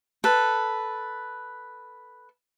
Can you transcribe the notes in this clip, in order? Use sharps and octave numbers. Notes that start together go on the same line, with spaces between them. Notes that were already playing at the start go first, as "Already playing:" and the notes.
A4 B4